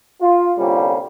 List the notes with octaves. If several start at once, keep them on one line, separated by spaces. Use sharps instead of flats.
F4
C2 D3 G3 A#3 C#4